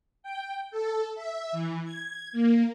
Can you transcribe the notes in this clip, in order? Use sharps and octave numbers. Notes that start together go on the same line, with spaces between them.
G5
A4
E5
E3
G#6
A#3